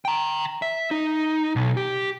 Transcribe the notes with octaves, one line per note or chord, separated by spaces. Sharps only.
G5 A#5
E5
D#4
B1
G4